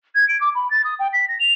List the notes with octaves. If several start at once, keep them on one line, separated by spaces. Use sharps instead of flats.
G#6
D7
D6
B5
A6
D#6
G5
B6
A#6
F7